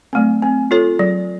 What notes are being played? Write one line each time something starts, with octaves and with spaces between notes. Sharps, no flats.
F#3 A3 C4
C4
F4 A4 C#5
F#3